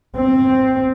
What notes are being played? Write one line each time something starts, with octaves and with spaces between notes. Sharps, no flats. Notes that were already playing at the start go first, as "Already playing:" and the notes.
C4